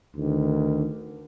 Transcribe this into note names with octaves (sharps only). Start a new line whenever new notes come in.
D2 D#3